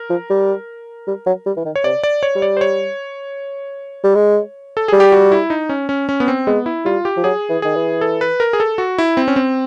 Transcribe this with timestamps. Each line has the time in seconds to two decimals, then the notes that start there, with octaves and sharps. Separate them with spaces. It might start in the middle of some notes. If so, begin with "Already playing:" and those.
Already playing: A#4
0.10 F3
0.30 G3
1.08 G3
1.26 F#3
1.46 G3
1.57 E3
1.65 D#3
1.76 C#5
1.84 C3 D5
2.03 D5
2.23 C#5
2.36 G3
2.42 D5
2.57 C5
2.61 C#5
4.04 G3
4.15 G#3
4.77 A4
4.88 G3 G#4
5.00 G4
5.12 F#4
5.32 E4
5.50 D#4
5.69 C#4
5.89 C#4
6.09 C#4
6.20 B3
6.28 C4
6.47 G#3 B3
6.66 E4
6.85 G3 F4
7.05 G4
7.17 F3
7.24 F#3 G#4
7.49 E3
7.62 D#3 G#4
7.76 E3
8.01 A4
8.21 B4
8.40 A#4
8.53 G#4
8.60 A4
8.78 F#4
8.98 E4
9.17 C4
9.28 C#4
9.36 C4